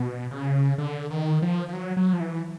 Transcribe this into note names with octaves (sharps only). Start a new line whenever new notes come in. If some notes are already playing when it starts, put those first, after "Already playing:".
Already playing: B2
C#3
D3
D#3
F3
F3
F#3
F#3
F3
E3